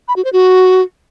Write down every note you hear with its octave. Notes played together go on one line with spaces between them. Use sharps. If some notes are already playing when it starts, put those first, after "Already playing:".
B5
F#4
C5
F#4